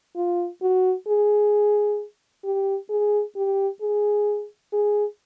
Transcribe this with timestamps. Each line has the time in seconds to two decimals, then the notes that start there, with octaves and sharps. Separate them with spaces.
0.16 F4
0.63 F#4
1.08 G#4
2.45 G4
2.90 G#4
3.36 G4
3.82 G#4
4.73 G#4